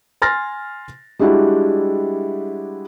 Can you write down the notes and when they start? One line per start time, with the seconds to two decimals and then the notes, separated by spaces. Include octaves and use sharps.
0.22 G#5 C6 F6 A6 A#6
1.19 G3 G#3 D4 E4 F#4 G4